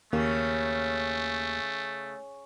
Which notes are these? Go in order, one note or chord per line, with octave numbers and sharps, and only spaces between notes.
D#2 C#3 A3 A#3 G4